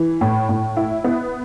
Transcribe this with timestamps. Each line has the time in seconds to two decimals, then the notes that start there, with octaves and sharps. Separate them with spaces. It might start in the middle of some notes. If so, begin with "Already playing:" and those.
Already playing: E3
0.21 A2
0.49 A2
0.77 E4
1.04 B3